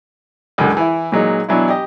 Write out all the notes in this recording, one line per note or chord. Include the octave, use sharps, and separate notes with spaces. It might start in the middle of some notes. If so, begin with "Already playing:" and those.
C#2 F#2 D3
E3 E4
A#2 F#3 G#3 D#4
B2 E3 F#3 D4 E4
G4 D#5